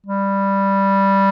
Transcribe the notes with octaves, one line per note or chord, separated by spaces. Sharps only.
G3